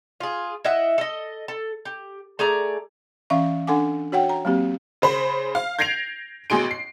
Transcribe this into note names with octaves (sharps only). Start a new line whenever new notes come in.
F4 G#4
E4 D#5 E5 F#5
A4 D#5
A4
G4
A3 G#4 D5 A#5
E3 C#4 E5 F5 C#6
D4 A4 F#5 G#5 D6
F#4 C#5 F#5 G5
A#5
F#3 A#3 C4 G4
C#3 C5 B5
F5
G6 G#6 A#6 C7 D7 F7
A1 B2 G#4 C6 D7
C7